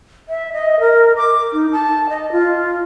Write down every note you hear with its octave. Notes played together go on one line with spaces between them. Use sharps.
E5
D#5
A#4
D6
D#4
A5
D#5
F4